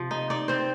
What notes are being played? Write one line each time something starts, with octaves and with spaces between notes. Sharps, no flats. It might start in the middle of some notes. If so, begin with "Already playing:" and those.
Already playing: C3 F3
D#4
D#4 D5
C4 C5